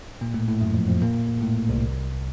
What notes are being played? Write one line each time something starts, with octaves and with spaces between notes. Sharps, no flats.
A#2 A#3
A2 A3
A2 A3
F#2 F#3
F2 F3
F2 F3
A#2 A#3
A2 A3
C2 C3